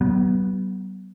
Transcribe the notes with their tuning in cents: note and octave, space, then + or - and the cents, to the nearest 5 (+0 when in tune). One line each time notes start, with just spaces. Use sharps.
F#3 +45 B3 -10